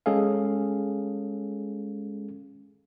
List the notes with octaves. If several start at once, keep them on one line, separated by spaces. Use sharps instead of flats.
G#3 C#4 G#4 A4 F5